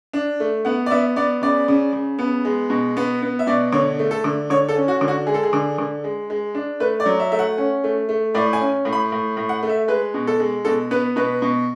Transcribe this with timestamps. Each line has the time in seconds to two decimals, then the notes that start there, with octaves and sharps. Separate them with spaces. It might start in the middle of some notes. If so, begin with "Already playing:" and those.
0.13 D4
0.40 A3
0.65 B3 F#5
0.86 D5
0.91 B3 E5
1.16 B3 D5
1.42 C#3 D5
1.68 C#3
1.93 C#3
2.19 B3
2.45 G#3
2.70 B2
2.97 B3
3.22 B3
3.39 E5
3.47 B2 D5
3.72 D3 C#5
3.99 A3
4.11 A4
4.24 D3
4.50 D3 C#5
4.69 A4
4.76 C#4
4.88 F#4
5.01 D3
5.08 F#4
5.27 G#3 G#4
5.34 A4
5.43 G#4
5.53 D3
5.78 D3
6.04 G#3
6.30 G#3
6.55 D4
6.80 A3 B4
7.00 D5
7.06 F#3
7.20 E5
7.32 A3 E5
7.39 F#5
7.58 C#4
7.84 A3
8.09 A3
8.34 A2 D5
8.53 G#5
8.60 C#4
8.85 A2
8.93 B5
9.12 A2
9.37 A2
9.49 F#5
9.63 A3
9.69 E5
9.88 G#3 B4
10.14 B2
10.27 A4
10.40 G#3
10.65 B2 A4
10.91 B3 B4
11.16 B2 B4
11.42 B2